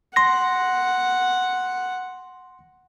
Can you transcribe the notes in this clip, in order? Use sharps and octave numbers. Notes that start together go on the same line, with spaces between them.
F#5 C6 A#6